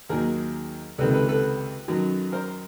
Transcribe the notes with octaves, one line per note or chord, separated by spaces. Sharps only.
D#2 D#3 F#3 G#4 A#4
C#2 C3 D#3 A4 B4
A4 B4
A4 B4
F#2 D#3 F#3
A#4 C5